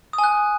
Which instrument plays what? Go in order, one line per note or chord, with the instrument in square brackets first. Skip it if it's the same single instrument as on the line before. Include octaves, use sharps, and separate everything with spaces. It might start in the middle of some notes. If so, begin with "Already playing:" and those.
[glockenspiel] D#6
G#5
F#6